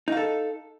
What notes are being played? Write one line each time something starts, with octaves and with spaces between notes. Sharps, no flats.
D#4 A4 F5